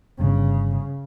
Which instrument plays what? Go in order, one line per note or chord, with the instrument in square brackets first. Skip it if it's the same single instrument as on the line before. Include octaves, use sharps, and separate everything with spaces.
[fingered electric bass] G1 G2 [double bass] C#3